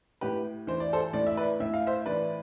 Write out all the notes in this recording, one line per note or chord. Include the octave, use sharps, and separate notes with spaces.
A2 G4 B4
E3 C5
D5
A4 C5
A2 D5
E5
B4 D5
A2 E5
F5
C5 E5
E3 B4 D5